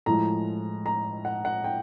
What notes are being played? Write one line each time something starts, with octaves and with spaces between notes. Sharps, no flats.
A2 F3 G#3 A#5
A#5
F#5
F#5
G5